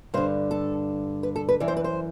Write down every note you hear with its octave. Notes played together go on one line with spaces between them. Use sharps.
G2 D3 C5
A4
B4
A4
B4
F#2 E3 D5
C5
B4
C5